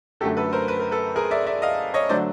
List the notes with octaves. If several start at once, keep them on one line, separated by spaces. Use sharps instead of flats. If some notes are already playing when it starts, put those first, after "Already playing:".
F#2 D3 F#3 A3 G4 A4
A4 B4
A#4 C5
B4
A#4
A4 B4
G#4 A#4
D5 E5
D5 E5
D#5 F5
C#5 D#5
D3 F#3 A3 C5 D5